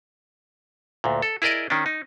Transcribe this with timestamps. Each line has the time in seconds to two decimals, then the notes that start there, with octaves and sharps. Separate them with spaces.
1.04 D2 A#2
1.22 A4
1.42 E4 G#4 A#4 D5 D#5
1.70 D#3 C#4 D4
1.86 D#4